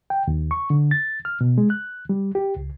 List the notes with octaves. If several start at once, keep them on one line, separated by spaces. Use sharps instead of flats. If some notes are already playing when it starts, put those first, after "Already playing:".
G5
D#2
C#6
D3
A6
F6
B2
G#3
F#6
G3
G4
C#2